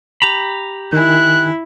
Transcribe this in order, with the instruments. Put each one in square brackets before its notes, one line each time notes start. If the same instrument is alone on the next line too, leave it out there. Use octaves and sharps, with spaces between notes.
[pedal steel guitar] G4 A#5 B5
[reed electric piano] D#3 G#5 [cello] E4 [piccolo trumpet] F#6